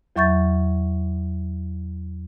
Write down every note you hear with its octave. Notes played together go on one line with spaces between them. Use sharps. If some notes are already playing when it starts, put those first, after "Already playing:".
E2 F#3 E5 C#6 G6 A6